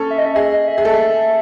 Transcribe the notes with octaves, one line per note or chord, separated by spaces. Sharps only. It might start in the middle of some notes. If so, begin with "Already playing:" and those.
Already playing: C#4 A4
E5
D#5
E5
G#4 D#5
D#5
E5
G#4
A4